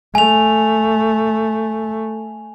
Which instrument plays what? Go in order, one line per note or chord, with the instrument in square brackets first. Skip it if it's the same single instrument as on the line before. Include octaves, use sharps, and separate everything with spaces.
[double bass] A3 [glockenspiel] G#5 F7